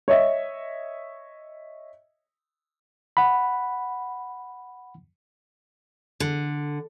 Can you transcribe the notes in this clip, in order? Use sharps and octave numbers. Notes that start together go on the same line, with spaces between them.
C#5 D#5 E5
F#5 B5
D3